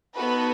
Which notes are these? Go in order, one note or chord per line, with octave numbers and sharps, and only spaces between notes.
B3 D#4 F#4 A4 B4 B5